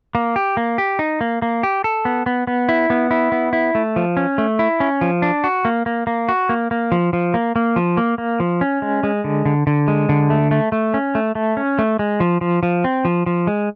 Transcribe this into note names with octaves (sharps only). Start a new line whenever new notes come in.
A#3
G4
A#3
G4
D#4
A#3
A#3
G4
A4
B3
B3
B3
E4
B3
E4
B3
E4
A3
F3
C#4
A3
E4
C#4
F3
D4
F#4
A#3
A#3
A#3
F#4
A#3
A#3
F3
F3
A#3
A#3
F3
A#3
A#3
F3
C#4
G#3
G#3
D3
D3
D3
G#3
D3
A3
A3
A3
C#4
A3
A3
C#4
A3
G#3
F3
F3
F3
C4
F3
F3
G#3